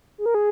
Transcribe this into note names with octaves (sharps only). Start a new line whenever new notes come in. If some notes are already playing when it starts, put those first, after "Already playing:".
G#4
A#4
G#4